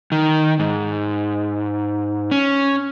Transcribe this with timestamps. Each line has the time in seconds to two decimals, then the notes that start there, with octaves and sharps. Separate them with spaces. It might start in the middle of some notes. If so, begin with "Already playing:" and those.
0.12 D#3
0.59 G#2
2.31 C#4